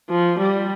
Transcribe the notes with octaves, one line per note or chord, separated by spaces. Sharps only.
F3
G3